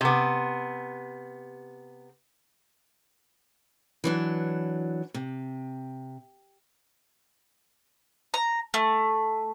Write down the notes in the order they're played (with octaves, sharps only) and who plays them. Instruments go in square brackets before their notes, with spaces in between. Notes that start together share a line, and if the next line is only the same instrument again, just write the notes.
[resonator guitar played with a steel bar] C3 B3
[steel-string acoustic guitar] E3 F#3 D4
C3
[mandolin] A#5
A3